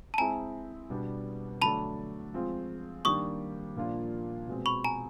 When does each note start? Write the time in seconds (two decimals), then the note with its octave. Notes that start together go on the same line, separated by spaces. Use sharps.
0.14 A5
0.18 G#3 C4 E4 G#4 G#5 A#5
0.90 B2 G3 B3 D4
1.62 D3 F#3 A3 D4 A5 B5
2.34 F3 G#3 C4 F4
3.05 D#3 G3 A#3 D4 G4 C#6 D#6
3.76 A#2 F3 A#3 D4 F4
4.48 B2 G#3 C4
4.66 B5 C#6
4.84 G#5 A#5